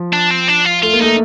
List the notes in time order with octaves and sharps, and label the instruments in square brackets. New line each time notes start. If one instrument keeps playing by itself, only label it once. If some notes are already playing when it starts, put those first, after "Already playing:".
Already playing: [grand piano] F3
[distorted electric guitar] D4
C4
D4
F4
[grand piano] A3 [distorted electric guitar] F4
[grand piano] A#3
[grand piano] A3 [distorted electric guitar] D#4